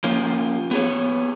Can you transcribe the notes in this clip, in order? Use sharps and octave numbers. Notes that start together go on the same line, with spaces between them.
F3 A#3 C#4 F4
B3 G#4 C#5